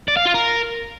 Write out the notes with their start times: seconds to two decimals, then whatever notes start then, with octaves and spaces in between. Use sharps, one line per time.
0.08 D5
0.17 F5
0.26 F4
0.34 A#4